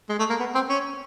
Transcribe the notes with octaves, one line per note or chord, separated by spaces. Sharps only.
G#3
A3
A#3
B3
C4
C#4